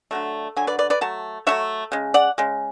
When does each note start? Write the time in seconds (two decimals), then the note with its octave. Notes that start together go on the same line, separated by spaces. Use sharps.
0.11 D3 F#3 A3
0.57 D3 F#3 G#5
0.67 B4 D5
0.79 B4 D5
0.90 B4 D5
1.01 F#3 A3 A5
1.47 F#3 A3 D4 C#5 E5
1.92 C#3 G#3
2.14 D5 F#5
2.38 C#3 G#3